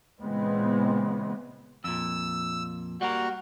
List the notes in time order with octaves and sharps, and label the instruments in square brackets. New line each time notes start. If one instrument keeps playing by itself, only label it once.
[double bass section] A#2 C#3 E3 G#3 B3 C4
[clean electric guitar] F2 A#2 [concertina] E6
[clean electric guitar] G3 A#3 A#4 [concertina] F#4